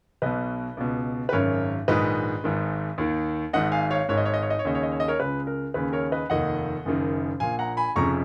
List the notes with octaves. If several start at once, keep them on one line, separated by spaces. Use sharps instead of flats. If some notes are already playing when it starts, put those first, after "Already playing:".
B1 B2 B4 D#5
C#2 B2
B4
G#1 F#2 C#3 A#4 C#5
A#1 G#2 D#3 B4 D#5
G#1 G#2 D#3
D#2 D#3
G#1 G#2 D#3 D#5 F#5
F5 G#5
C#5 F5
G#1 G#2 D#3 C#5
D#5
C#5
D#5
C#5
D#5
C#5
D#2 C#3 D#5
C#5
D#5
C#5
D#5
A#4 C#5
C#2 C#3 B4
A#4
D#2 C#3 B4
A#4 C#5
B4 D#5
F1 D#2 D#3 D#5 F#5
F#1 F#2 D#3
A#1 A#2 F5 G#5
F#5 A#5
G#5 B5
F1 F2 C#3 A#5 C#6